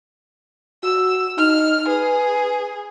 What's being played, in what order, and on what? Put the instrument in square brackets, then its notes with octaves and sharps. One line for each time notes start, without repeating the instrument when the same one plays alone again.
[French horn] F#4 [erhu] E6
[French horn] D#4 [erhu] F6
[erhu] G#4 [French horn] B4